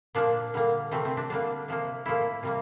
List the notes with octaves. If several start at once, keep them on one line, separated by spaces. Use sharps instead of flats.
A#2 F3 A#3 D4
D3 G3 A#3
C3 E3 A3 C4
C4
D4
D3 G3 A#3 D4
C3 F3 A#3
A2 F3 A#3 E4
C3 G3 A#3